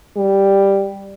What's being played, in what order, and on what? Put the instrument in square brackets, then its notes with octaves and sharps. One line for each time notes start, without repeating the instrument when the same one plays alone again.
[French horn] G3